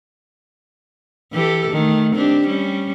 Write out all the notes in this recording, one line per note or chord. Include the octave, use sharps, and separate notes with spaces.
E3 G4 A4
D#3 A3
C4 D4 G4
G3 C#4